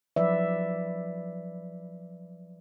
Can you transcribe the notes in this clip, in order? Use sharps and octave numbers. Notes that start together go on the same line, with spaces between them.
F3 F#3 B4 D5 E5